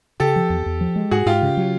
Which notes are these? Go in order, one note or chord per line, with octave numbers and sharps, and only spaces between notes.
C#3 G4 A4
F3
E2
E2
F3
G#3
G#2 F#4 G#4
G#2 F4 G4
C#3
F#3